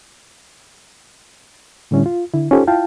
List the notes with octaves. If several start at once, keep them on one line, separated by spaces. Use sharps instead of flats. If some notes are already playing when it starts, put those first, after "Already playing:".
A2 D3 G3 C#4 E4
F4
D3 E4
C#4 D#4 F4 G4 A4 C5
E4 F4 F5 G5 A5